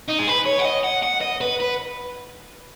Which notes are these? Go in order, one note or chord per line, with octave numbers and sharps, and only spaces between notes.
D#4
G#4
B4
C#5
F#5
D#5
F#5
F#5
D#5
B4
B4